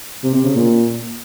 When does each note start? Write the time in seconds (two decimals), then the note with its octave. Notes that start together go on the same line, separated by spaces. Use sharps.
0.24 C3
0.35 C3
0.45 C#3
0.56 A#2